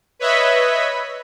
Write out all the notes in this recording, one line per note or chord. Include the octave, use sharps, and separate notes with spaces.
B4 C#5 D#5 E5 B5